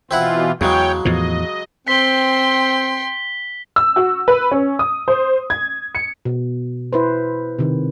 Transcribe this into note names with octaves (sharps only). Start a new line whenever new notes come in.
B2 E3 C4 E4 F4 F#5
E2 C#3 F#3 G#3 C#5 G5
E2 A2 F3 D#5
C4 G5 C6 B6 G7
E6
F#4
B4
C#4
D#6
C5
G#6
C#7
B2
E4 B4 C5
C3 D#3